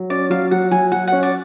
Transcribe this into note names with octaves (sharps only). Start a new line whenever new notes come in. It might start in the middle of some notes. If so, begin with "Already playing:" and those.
Already playing: F#3
C#4 D5
F#3 F5
F#3 F#5
F#3 G#5
F#3 F#5
C#4 F#5
D5